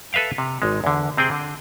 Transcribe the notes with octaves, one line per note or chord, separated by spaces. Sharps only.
A4 B4 E5 F5 G5
C3
G#1 G#3
E2 D3
C3 C4 G#4 G5
D3